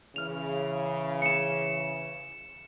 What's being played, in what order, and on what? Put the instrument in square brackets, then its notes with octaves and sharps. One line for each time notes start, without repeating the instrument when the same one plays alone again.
[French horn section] C#3 E3 [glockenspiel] F6 F7
[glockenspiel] C#7 E7